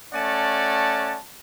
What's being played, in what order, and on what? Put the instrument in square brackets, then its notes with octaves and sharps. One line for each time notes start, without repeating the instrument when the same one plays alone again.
[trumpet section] A3 C#4 D5 F#5 A5